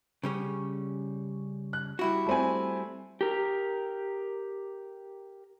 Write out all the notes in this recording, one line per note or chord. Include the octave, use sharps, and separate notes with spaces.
C#3 G3 C#4
F#6
G3 E4 F#4
A3 C4 G#5
G4 A#4